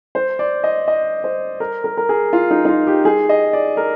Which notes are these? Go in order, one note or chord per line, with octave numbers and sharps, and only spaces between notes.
C5
D5
D#5
D#5
C5
A#4
A#4
A#4
G#4
F4
D#4
D#4
F4
G4
G#4
D#5
D5
A#4